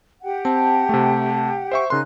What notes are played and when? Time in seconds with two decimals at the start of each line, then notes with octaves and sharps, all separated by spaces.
0.22 G4 F#5 G5
0.45 C4 A5
0.89 C3 A3
1.72 C5 E5 C#6
1.90 C#3 D#4 A#4 C6 F#6